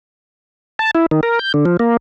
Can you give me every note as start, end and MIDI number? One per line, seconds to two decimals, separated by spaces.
0.79 0.91 81
0.95 1.06 64
1.11 1.21 51
1.23 1.39 70
1.39 1.52 91
1.54 1.65 50
1.65 1.77 53
1.80 1.97 58